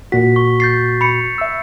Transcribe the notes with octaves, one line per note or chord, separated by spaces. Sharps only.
A#2 F#4 B6
C#6
G6 A6 C7
B5 C#7
E5 E6